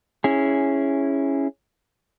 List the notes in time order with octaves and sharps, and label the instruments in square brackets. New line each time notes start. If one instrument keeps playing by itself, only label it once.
[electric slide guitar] C#4 E4 G#4